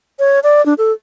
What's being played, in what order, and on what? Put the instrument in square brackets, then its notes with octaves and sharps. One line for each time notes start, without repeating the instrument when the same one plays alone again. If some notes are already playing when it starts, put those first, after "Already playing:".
[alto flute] C#5
D5
D4
A4